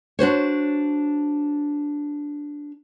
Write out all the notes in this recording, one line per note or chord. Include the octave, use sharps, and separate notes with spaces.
D4 F#4 C5 C#5